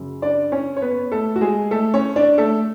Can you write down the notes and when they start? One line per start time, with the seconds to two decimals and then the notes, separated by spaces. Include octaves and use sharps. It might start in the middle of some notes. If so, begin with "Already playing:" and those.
Already playing: F#2 C#3
0.22 D4 D5
0.52 C#4 C#5
0.77 C#5
0.82 B3 B4
1.12 A3 A4
1.36 F#4
1.41 G#3 G#4
1.71 A3 A4
1.94 C#4 C#5
2.16 D4 D5
2.38 A3 A4